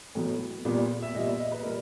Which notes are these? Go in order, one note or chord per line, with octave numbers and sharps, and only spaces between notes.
A2 F#3 B3
A#2 G3 B3
E5
A#2 G3 B3 D#5
E5
D#5
B4
A#2 G3 A#4